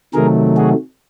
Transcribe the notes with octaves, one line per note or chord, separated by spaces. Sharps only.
C3 D#3 F#3 A3 G#4 A#4
F#4 G#4